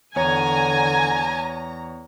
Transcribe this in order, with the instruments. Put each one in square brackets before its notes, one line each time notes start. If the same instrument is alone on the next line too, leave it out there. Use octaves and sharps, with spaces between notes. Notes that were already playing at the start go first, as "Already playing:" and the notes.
[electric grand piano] E2 C#5 [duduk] D3 [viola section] G#5 [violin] A#5